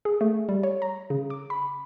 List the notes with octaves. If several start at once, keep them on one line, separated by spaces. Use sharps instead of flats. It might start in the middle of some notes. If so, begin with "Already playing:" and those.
G#4
A3
G3
C#5
A#5
C#3
D6
B5